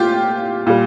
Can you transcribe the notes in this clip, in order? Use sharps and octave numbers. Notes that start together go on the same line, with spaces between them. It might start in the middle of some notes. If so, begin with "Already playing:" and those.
Already playing: A#2 F4 G4
A#2 G3